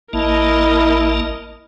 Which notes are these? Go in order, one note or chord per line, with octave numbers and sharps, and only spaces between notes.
A1 A#3 E4 A#4 D#5 A5